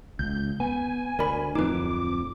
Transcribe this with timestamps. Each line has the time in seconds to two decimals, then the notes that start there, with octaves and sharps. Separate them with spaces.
0.19 C#2 G6
0.60 B3 G#5
1.19 D2 A#4 D5 B5
1.55 D1 F2 D#4 B4 D6